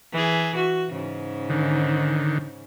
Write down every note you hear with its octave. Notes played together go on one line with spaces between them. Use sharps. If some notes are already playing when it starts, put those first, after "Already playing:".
E3 G#4
F#4
G#2 C#3
D3 D#3